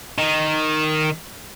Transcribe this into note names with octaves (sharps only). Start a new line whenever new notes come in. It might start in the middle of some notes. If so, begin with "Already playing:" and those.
D#3